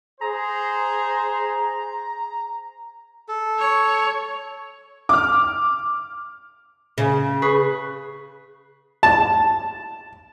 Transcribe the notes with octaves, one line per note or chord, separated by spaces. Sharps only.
G#4 C5 A#5
A4
C#5
D6 F6
C#3
G#4 B4 C#6
A5